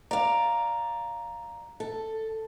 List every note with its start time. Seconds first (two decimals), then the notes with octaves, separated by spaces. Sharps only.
0.11 D5 F5 A#5
1.80 A4